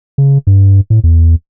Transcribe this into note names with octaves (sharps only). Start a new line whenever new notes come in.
C#3
G2
A2
E2